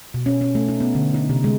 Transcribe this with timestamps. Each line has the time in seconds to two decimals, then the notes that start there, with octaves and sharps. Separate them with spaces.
0.14 B2
0.26 C#4
0.41 C#4
0.55 A3
0.68 D#4
0.80 B3
0.95 D3
1.14 D#4
1.29 C3
1.44 G#3